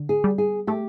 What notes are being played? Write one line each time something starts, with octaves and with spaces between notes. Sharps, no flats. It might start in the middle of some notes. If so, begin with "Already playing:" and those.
Already playing: D3
G#4
G3
G#4
A3 G4